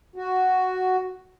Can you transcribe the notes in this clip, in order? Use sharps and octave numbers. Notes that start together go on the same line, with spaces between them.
F#4